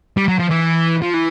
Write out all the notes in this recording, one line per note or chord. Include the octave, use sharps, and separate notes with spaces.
G3
F#3
F3
E3
F3
E3